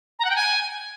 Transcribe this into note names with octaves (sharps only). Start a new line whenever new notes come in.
A#5
F#5
G5
G#5